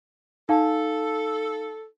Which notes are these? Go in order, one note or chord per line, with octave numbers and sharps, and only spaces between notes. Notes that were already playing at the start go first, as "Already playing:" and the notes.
D#4 A4 F5 A5